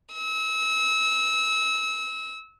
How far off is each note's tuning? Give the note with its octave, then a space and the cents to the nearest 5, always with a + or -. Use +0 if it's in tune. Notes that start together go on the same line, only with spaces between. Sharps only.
E6 -30